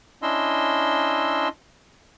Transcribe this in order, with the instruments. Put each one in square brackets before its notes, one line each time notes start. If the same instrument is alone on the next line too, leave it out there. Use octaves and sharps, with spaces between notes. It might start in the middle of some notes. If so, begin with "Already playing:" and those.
[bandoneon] C#4 D4 E4 D#5 C6 E6